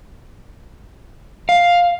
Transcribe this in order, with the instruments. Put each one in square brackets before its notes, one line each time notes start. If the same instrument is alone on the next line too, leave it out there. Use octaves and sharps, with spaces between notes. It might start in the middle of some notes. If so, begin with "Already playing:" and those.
[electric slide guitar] F5